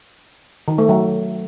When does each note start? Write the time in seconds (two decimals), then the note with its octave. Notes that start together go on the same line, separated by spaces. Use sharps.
0.68 D#3
0.78 A3
0.89 F#3